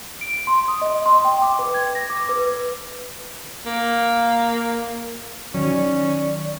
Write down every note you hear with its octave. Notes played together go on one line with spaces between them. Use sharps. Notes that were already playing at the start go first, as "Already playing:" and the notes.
D7
C6
D#6
D#5
C6
G5
D6
B4
G#6
A#6
D6
B4
A#3
D#3 F#3 C#4 D5